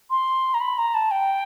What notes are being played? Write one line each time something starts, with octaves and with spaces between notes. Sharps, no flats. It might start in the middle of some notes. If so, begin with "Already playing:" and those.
C6
A#5
B5
A#5
A5
G5